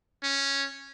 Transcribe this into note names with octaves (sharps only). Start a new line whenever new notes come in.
C#4